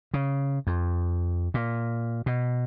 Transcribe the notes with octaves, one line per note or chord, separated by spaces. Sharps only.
C#3
F2
A#2
B2